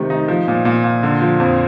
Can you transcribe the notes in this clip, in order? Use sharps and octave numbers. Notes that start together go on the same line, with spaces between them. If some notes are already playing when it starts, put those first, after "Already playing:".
Already playing: C3 D#3 A3
D#4
F3
A#2
A#2
A#2
D3
F3
F2